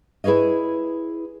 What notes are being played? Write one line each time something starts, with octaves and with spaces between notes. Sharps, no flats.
E4 G#4 B4 C#5 D#5